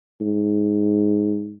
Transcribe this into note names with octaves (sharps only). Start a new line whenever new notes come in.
G#2